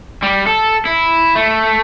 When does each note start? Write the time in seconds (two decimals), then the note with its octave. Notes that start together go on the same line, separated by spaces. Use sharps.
0.23 G3
0.47 A4
0.85 E4
1.36 A3